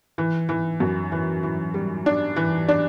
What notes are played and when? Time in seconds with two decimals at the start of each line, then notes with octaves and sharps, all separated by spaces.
0.18 E3
0.49 E3
0.80 F#2
1.12 E3
1.43 E3
1.74 G3
2.06 D4
2.36 E3
2.68 D4